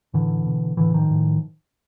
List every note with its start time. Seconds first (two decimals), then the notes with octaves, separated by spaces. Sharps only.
0.14 A2 D3 E3
0.46 B2
0.77 A2 D3 E3
0.94 D#3 F3
1.10 A2